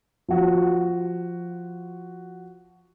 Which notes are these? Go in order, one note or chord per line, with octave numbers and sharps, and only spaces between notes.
F3 F#4